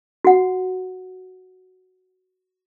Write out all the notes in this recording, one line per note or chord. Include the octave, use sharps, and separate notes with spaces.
F#4 F#5